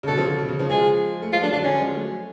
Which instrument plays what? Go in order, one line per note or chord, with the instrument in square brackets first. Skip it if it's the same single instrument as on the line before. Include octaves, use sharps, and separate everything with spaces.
[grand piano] C#3
[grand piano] B2 D3 [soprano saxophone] A4
[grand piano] C#3 F3
C#3
B2
C#3
C#3 F3
[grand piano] F3 G#3 [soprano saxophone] G#4
[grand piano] A3
[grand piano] F3 G#3 [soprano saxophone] F4
[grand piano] F#3 A3 [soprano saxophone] D4
[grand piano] D3 F#3 [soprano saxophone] D4
[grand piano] D3 F#3 [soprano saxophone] C#4
[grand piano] F3 G#3
F#3 A3